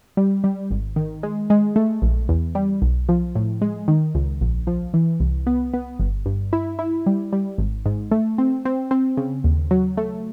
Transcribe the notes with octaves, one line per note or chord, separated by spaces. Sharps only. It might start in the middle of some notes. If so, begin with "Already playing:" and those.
G3
G3
G#1
D#3
G#3
G#3
A3
A#1
E2
G3
B1
F3
A2
G#3
D#3
C#2
A#1
F3
E3
C2
B3
B3
G1
G2
E4
E4
G3
G3
G#1
G#2
A3
C4
C4
C4
C#3
D#2
F#3
A3